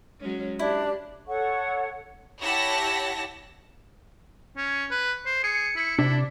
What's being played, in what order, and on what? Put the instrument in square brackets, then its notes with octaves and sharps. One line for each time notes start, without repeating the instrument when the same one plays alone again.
[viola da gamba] F#3 G#3 C#4
[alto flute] D4 [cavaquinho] E4 [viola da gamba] G4
[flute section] A4 C#5 F#5 C#6
[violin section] E4 G4 C#5 F#5 A5 A#6
[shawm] C#4
B4
C5
[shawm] G#4 [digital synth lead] C#7
[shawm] E4
[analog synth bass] C3 [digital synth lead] D4 [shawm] E4